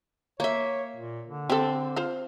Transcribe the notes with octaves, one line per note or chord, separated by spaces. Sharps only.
A#3 C#5 E5
A#2
D3
C4 G4 A4
F4 C5 F5